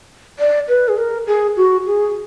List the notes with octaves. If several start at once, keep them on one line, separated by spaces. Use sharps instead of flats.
D5
B4
G#4
A#4
G#4
F#4
G#4